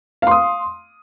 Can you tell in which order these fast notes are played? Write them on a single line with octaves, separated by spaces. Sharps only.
F5 C6 D#6